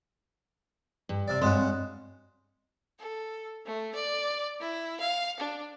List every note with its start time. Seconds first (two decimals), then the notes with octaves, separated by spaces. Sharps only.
1.09 G2
1.28 C3 D5
1.42 G2 G#3 C4 C#4 F#4
2.99 A4
3.65 A3
3.95 D5
4.60 E4
4.99 F5
5.39 D4